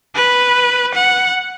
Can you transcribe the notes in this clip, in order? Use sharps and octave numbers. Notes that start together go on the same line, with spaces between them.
B4
F#5